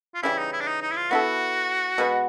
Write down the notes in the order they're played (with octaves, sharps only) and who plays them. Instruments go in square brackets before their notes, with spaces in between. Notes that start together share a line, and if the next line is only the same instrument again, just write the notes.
[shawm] F4
[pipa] C#3 E3 G3 [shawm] E4
[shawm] D#4
E4
D4
D#4
D#4
E4
F4
[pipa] B3 E4 A4 [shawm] F#4
[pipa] B2 G#3 B3